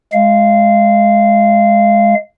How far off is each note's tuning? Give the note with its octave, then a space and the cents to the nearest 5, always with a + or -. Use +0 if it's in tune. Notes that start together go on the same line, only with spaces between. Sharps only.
G#3 +5 F5 -20